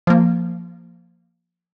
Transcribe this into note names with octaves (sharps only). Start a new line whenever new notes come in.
F3 A#3